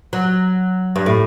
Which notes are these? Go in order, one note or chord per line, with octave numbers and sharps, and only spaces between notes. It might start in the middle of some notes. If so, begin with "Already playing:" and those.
F#3
G2
A2